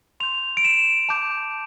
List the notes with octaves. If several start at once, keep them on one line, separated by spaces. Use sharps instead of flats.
C6 G6 F7
D7
E7
A5 D6 G6